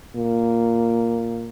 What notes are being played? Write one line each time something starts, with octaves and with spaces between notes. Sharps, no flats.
A#2